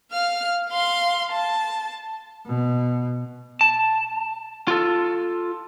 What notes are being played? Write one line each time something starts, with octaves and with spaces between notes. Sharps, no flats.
F5 F6
F5 C6
A5
B2
A5
F4 A4